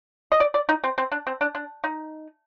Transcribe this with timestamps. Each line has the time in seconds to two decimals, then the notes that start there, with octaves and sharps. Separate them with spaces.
0.32 D#5
0.40 D5
0.54 D5
0.69 D#4
0.84 C4
0.98 C4
1.12 D4
1.27 C4
1.41 D4
1.55 D4
1.84 D#4